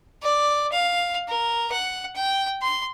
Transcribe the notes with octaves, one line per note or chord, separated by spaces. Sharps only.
D5
F5
A#4
F#5
G5
C6